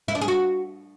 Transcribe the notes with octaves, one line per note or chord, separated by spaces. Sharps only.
E4
D4
G#4
F#4